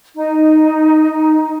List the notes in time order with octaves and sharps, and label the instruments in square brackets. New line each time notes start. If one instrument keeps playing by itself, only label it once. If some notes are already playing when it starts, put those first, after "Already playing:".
[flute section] D#4